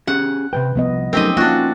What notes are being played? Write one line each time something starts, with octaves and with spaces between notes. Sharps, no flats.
C#4 G4 G#4 F#5
C3 E3 B4 G5
C2 F3 B3 D#5
F#3 A3 C4 C#4 D#4 G4 A#4 D#5
A#3 C#4 D4 F4 F#4 F#5